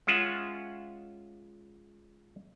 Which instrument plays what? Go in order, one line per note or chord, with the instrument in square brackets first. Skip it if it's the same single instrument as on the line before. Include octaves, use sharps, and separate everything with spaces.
[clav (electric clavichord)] G#3 C#4 F4 E5 F#5